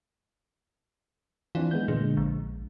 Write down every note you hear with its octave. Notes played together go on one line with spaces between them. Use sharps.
E3 C4 D4 F4
G#3 B3 G6
A#2 D3 G#3
A#1